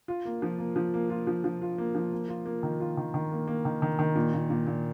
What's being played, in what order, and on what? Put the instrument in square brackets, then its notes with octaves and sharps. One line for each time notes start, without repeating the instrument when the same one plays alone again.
[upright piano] F4
A#3
F3
A#3
F3
A#3
F4
F3
F3
F4
A#3
F3
A#3
F4
A#3
D#3
F4
D#3
D#3
A#3
A#3
D#3
D#3
D#3
A#2
A#2
A#2
A#2